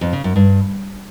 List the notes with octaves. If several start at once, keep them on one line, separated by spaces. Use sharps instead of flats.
F2
C#3
F#2
G2